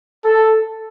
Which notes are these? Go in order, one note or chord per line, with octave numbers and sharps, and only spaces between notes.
A4